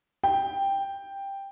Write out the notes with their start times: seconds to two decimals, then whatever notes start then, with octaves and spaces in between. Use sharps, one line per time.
0.24 G5